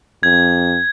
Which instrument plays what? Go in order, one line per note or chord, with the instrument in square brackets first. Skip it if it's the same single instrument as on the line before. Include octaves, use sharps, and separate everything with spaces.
[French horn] F2 [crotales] G#6